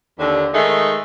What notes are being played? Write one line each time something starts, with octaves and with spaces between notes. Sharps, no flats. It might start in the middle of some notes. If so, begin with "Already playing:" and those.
D#2 D3
D#3 G#3 A3 D#4